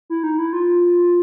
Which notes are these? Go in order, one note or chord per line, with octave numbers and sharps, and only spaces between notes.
E4
D#4
E4
F4